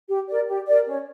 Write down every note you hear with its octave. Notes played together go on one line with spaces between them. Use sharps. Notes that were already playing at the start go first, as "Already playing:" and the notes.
G4
A#4 D5
G4
A#4 D5
C#4